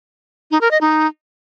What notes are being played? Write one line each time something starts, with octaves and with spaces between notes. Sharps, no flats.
D#4
A#4
D#5
D#4